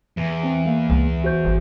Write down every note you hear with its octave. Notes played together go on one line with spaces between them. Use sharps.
E2
C4
A#3
C#2
F#4 C5 G6
G#1